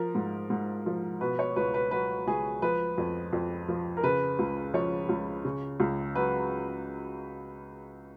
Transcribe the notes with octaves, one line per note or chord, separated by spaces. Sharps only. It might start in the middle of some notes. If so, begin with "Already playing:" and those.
Already playing: F3 A#4
G#2
G#2
F3
B2 B4
C#5
C#2 B4
B4
F#3 B4
C#2 G#4
F3 B4
F2
F2
F3
A#4
C#3 B4
C#2
F3 C#5
C#2
C#3
C#2
F#3 B4